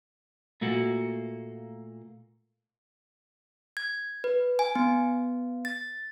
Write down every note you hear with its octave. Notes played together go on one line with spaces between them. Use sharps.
A#2 A3 A#3 F#4
G#6
B4
G#5
B3
A6